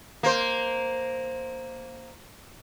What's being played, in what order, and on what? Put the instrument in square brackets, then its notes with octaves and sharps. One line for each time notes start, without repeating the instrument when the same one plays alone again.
[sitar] A#3 C5